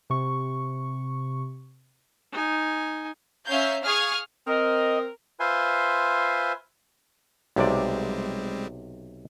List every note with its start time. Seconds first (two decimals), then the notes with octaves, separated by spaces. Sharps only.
0.10 C3 C#6
2.32 D#4 G#5
3.45 C#4 E5 F5 A#5 G6
3.83 G#4 F5 C#6 D#6 F6 G#6
4.47 C4 A#4 D#5
5.40 F4 B4 C5 E5 G#5 C6
7.56 B1 C3 G3 G#3 C4 D5